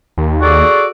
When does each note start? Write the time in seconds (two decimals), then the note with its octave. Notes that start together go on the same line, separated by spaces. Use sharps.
0.18 D#2
0.41 F#4 G#4 A4 D5